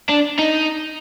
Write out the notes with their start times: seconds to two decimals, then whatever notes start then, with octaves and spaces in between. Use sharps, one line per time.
0.09 D4
0.39 D#4